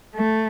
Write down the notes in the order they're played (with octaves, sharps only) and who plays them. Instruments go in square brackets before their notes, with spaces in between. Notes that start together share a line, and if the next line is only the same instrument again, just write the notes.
[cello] A3